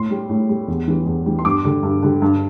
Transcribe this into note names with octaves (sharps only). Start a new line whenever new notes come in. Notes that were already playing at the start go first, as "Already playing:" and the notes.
Already playing: A2 C6
G3
A2
G3
E2
E3 G3
E2
E3 G3
C6
G2 D6
D3 G3
G2
D3 G3
G2